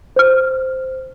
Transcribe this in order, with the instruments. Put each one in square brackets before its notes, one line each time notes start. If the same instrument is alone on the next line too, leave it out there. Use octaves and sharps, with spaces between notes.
[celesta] C5 F6